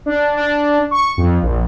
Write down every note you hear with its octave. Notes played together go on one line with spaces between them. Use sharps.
D4
D4
C#6
F2
A#1